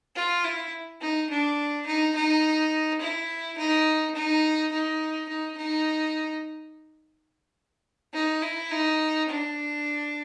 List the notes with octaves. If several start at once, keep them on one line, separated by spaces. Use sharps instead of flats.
F4
E4
D#4
D4
D#4
D#4
E4
D#4
D#4
D#4
D#4
D#4
D#4
E4
D#4
D4